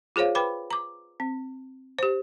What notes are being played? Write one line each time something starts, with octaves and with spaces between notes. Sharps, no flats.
F4 G#4 C5 C#5 F5
B4 G5 B5 D6
A#5 D6
C4
G4 C5